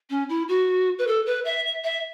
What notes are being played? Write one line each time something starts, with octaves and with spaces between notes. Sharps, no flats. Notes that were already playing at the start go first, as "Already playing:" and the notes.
C#4
E4
F#4
B4
A4
B4
E5
E5